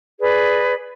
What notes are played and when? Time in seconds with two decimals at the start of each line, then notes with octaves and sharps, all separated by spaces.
0.20 G#4 B4 D5